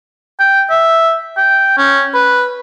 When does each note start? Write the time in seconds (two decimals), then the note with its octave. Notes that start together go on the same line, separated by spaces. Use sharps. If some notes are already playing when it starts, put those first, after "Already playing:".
0.39 G5
0.70 E5
1.37 G5
1.78 C#4
2.14 B4